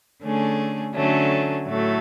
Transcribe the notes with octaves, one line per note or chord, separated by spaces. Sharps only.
D3 A3 C#4 G#4
D3 F#3 A3 C#4
A2 F#3 A3